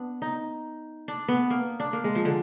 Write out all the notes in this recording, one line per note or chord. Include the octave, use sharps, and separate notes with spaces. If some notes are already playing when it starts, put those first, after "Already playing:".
Already playing: B3 D4
D#4
D4
B3
A#3
D4
A#3
G#3
F3
D3